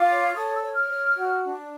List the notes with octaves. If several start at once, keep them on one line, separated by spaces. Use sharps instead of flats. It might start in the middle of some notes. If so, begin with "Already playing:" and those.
Already playing: F4 D6
C#5
A4 D#6
E6
C#5
F6
C#5
F#4
D4